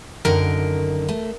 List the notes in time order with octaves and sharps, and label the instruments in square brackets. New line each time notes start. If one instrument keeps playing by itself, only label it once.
[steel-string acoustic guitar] F#2 D3 D#3 [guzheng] A#4
[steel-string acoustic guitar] A3